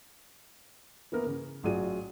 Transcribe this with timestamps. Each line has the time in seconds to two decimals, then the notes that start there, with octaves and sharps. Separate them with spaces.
1.12 E3 A#3 B3 A#4
1.27 C#3
1.63 A1 F#3 F4 G#4 D5 D#7